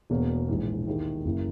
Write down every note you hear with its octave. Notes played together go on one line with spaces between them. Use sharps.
E1 E2 B2 A#3
A#1 G#2 E3
D#2 D#3 A#3 E4 G#4
F#1 F#2 E3 A#3 E4